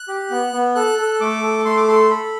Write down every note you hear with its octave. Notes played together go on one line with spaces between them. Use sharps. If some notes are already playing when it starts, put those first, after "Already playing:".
Already playing: F#6
G4
B3
B3
A4 F#6
A4
A3 D6
A4
A3 C6
D6
A4 C6
A4 B5